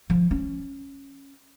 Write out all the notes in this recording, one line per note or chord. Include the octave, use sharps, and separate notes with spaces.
F3
C#4